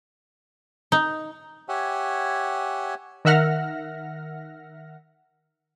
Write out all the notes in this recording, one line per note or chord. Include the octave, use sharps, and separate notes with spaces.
D#4
G4 C#5 E5 F#5 G#5
D#3 A#4 E5 F#5 F6 A#6